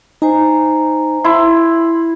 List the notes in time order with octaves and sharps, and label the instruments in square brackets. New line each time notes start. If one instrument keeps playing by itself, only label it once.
[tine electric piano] D#4 [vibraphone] C5 G#5 A#5
[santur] E4 [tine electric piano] C6